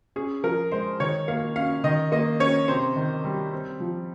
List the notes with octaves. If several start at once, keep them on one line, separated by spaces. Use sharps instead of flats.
C#4 G#4
F3 A#4
G#3 C5
D#3 C#5
A#3 F5
C#4 F5
D#3 D#5
A#3 D#5
C#4 C#5
C3 C5
D#3
G3
C4
F3